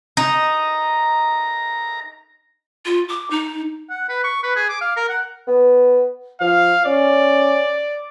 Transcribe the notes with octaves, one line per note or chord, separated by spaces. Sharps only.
D#4 A#5
F4
D6
D#4
F#5
B4
C#6
B4
G#4
D6
F5
A#4
F#5
B3
F3 F5
C#4 D5